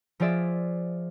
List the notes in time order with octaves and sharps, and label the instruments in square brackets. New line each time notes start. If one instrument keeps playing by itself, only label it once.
[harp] F3 F4 G#4 D5 E5